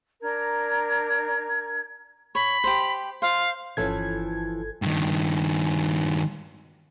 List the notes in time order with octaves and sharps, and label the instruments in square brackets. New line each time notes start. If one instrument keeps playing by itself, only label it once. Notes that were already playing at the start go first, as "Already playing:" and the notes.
[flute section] D4 A#4 A#5 G#6
[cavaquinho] C#5 [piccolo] B5
[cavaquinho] G4 C5
[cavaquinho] C5 [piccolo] F5
[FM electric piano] G1 A4 G#6 [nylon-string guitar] E3 F3 C#4
[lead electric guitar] G2 D#3